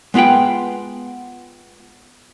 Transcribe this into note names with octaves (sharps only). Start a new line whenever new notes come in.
G#3 B3 F4 B4 G5